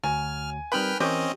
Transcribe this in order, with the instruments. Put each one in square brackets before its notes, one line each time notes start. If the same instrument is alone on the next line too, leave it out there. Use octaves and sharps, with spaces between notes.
[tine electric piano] D2 [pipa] F#3 [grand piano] G#5 [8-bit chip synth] F6
[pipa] D#3 B5 [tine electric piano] G3 C4 A#4 [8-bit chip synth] B4 G5 F6
[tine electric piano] E3 A#4 G6 [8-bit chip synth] C4 C#4 D#5 [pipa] G4 C#5